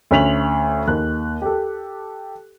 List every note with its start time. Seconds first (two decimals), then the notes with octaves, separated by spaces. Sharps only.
0.11 D2 C#4 B6 F7 F#7
0.87 D#2 F#6
1.42 G4 A4